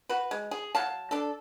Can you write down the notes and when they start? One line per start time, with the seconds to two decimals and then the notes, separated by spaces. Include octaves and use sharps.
0.09 F#4 B4
0.31 G#3
0.51 G#4
0.75 F#3 F5 A5
1.11 D4 A4